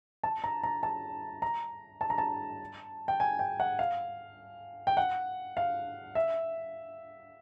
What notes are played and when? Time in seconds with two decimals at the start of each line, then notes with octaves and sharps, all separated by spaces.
0.23 A5
0.44 A#5
0.63 A#5
0.83 A5
1.42 A#5
2.01 A5
2.10 A#5
2.18 A5
3.08 G5
3.20 G#5
3.39 G5
3.60 F#5
3.79 F5
4.87 G5
4.97 F#5
5.57 F5
6.15 E5